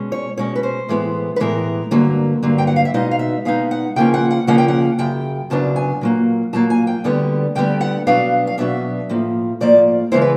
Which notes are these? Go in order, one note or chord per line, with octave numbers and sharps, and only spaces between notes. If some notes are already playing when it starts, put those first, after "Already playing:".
Already playing: B2 G#3 C#4
C#5
B2 G#3 C#4 C#5
B4
C5
A2 E3 G#3 B3
B4
A2 E3 G#3 B3 A#4
G2 D3 F#3 A#3
G2 D3 F#3 A#3
G5
F#5
F5
E5
B2 G#3 B3 D#4 D#5
F5
E5
B2 G#3 B3 D#4 F5
F#5
C#3 F3 A#3 C#4 G5
F#5
F#5
C#3 F3 A#3 C#4 F#5
G5
F#5
F#2 C#3 G5
F#2 C#3 F#3 B3 D4 A5
G#5
A#2 F#3 A#3
A#2 F#3 A#3 A5
G#5
G5
D2 D3 G3 B3
D2 D3 G3 B3 G5
F#5
B2 F#3 B3 D4 F5
F5
B2 F#3 B3 D4 E5
A2 F3 A#3
A2 F3 A#3 D5
C#3 E3 G#3 B3 E4 C5
B4